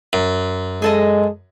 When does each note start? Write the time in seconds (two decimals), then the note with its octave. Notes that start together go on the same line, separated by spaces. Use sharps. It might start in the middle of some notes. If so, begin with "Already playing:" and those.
0.13 F#2
0.82 G#3 G#4 A4 D#5